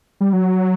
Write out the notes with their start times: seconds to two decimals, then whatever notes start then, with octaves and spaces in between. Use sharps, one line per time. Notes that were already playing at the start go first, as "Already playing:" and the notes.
0.21 G3
0.33 F#3